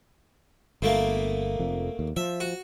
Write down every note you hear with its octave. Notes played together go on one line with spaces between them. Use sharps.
G1 B2 A3 A#3
F1 F2
D#2
F3 E5
F#4